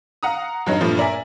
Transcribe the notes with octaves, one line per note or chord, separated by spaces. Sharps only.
F5 F#5 A#5 D#6
G2 F#3 D#4
G2 A#2 F3 A3
A#4 D5 E5 G#5